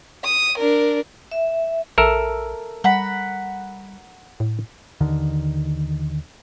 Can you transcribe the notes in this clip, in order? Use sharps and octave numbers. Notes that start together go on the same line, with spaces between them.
D#6
D4 A#4
E5
A#1 A4 A#4 E5
G3 F#5 A#5 B5
A2
D#2 D3 D#3